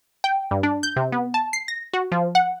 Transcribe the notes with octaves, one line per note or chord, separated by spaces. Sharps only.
G5
G2
D4
G6
C3
B3
A5
C7
A#6
F#4
F3
F#5